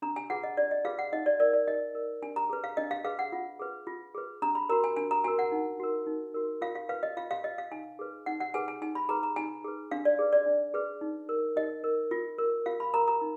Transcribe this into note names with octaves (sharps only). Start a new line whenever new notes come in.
D4 A#5
G#5
F4 G#4 B4 F#5
D#5
D4 D5
D#5
F4 G#4 B4 F5
F#5
D#4 D#5
D5
A#4 D5
D5
D#4 D#5
A#4
D4 G#5
A#5
G#4 B4
F5
D4 D#5
F5
G#4 B4 F5
F#5
F4
G#4 B4
F4
G#4 B4
D4 A#5
B5
F#4 A#4 A#5
G#5
D4 G#5
A#5
F#4 A#4 G#5
F#5
D#4
F#4 A#4
D#4
F#4 A#4
F4 F5
F5
B4 F5
D#5
F4 F5
F5
B4 D#5
F5
D#4 G#5
G#4 B4
D#4 F#5
F#5
G#4 B4 G#5
G#5
D#4 G#5
B5
G#4 B4 A#5
A#5
D#4 G#5
G#4 B4
D4 F5
D5
G#4 B4
D5
D4
G#4 B4
D#4
A#4
D#4 D#5
A#4
F4
A#4
F4 F5
B5
A#4 A#5
A#5
D#4